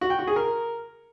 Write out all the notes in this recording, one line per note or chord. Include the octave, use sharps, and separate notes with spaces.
F#4
G5
F#4
G#4
A#4